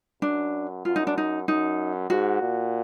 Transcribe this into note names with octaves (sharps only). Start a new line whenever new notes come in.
F#2 D4
F#2 F4
D#4
D4
D#4
F#2 D#4
G#2 F#4
A#2